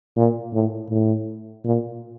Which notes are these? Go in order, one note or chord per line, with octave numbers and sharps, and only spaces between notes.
A#2
A2
A2
A#2